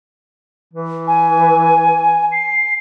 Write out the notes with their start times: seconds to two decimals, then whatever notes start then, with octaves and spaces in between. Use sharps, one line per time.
0.74 E3
1.07 G#5
2.32 C7